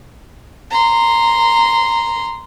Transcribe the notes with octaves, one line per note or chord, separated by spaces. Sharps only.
A#5 C6